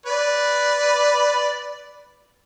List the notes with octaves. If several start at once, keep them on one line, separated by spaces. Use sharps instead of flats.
B4 D5